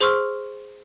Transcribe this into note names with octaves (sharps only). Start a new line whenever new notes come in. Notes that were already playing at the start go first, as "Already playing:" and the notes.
G#4 C5 C6 C#6 E6 F6